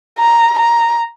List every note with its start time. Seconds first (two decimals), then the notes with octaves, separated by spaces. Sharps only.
0.19 A#5
0.59 A#5